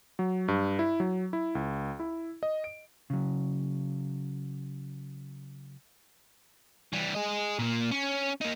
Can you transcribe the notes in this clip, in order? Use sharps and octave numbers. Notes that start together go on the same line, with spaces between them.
F#3
G2
E4
F#3
E4
C#2
E4
D#5
D7
C#3 F#3
E3 G3
G#4 D#5
A#2 A#3
C#4
A#3 D#4